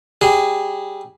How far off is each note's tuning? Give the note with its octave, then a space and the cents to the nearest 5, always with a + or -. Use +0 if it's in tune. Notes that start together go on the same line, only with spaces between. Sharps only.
G3 -10 G#4 -10